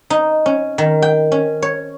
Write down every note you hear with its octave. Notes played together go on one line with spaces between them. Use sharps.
D#4
C#4
D#3
G5
C#4
C#5